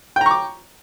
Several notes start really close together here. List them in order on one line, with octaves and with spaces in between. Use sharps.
G5 A#5 C#6 D6